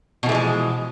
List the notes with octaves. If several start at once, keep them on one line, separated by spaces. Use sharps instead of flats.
B2 E3 F3 G#3 A3